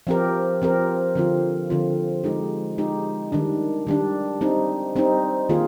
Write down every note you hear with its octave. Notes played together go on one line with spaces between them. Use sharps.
F3 C4 G4 A#4
F3 C4 G4 A#4
D3 F3 C4 F4
D3 F3 C4 F4
G#3 D#4 G4
G#3 D#4 G4
D#3 G3 D4
D#3 G3 D4
G3 C4 D#4
G3 C4 D#4
D#3 A#3 F4 G#4